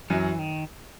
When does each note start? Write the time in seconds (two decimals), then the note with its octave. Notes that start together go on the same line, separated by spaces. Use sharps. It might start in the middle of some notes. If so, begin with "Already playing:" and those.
0.10 F#2 E3 F#3
0.39 D#3